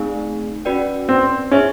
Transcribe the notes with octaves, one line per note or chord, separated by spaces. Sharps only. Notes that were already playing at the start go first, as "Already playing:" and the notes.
Already playing: A3 C4 D#4 G#4
C#4 F#4 B4 D5 G5
C4
C#4 G#4 C5 E5